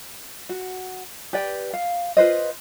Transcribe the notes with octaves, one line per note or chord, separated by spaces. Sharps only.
F#4
G4 B4 D5 G5
F5
F4 B4 C5 D#5